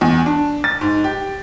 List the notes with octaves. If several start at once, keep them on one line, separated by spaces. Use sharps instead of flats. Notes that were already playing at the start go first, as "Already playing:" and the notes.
E2
D4
A6
G#2
G4